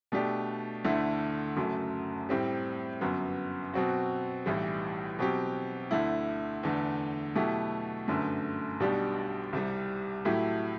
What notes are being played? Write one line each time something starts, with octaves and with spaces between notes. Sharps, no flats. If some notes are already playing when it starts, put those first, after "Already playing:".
B2 A3 D4 G4
D2 D3 A3 E4
F#1 F#2 F#3 A3
A2 G3 C4 G4
G1 F#2 F#3 B3
B2 F#3 C4 F#4
B1 A2 E3 G3
B2 F#3 C4 G4
D2 D3 A3 E4
E2 D3 A3
B2 F#3 A3 E4 G4
G1 F#2 D3 A3
B1 B2 G3 D4 G4
C2 C3 G3
A2 F#3 A3 E4 G4